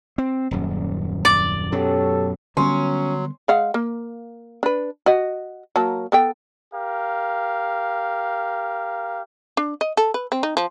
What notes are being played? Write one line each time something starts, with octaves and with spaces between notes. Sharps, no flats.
C4
D#1 F#2
D5
F#2 B2 F#3 G4 A4 C#5
D3 F#3 G3 B3 C#4 C6
G#3 F5 F#5
A#3
D4 B4
F#4 D#5
F#3 A#3 A5
B3 A4 G5
G4 A#4 F5
D4
D#5
A4
B4
C4
D#4
F3